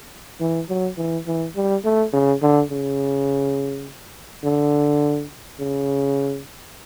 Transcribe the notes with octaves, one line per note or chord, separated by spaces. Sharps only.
E3
F#3
E3
E3
G3
A3
C#3
D3
C#3
D3
C#3